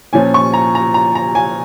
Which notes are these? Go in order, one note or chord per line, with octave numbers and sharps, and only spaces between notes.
A#2 F3 C#4 G#5
C#6
A#5
A#5
A#5
A#5
G#5